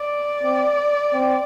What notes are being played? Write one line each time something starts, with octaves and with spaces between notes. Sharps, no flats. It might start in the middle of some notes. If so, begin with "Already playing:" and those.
Already playing: D5
C4
C4